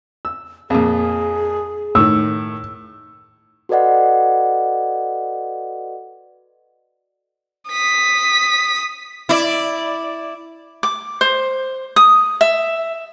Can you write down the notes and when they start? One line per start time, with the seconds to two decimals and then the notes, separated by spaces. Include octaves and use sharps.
0.25 E6
0.70 F2 A#2 G#4
1.95 A2 D#3 E6
3.69 F#4 A4 B4 D5 D#5 F#5
7.70 D#6 B6
9.29 E4 D5
10.83 D6
11.21 C5
11.96 D#6
12.41 E5